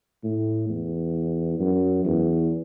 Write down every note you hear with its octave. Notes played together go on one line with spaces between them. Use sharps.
A2
E2
F#2
E2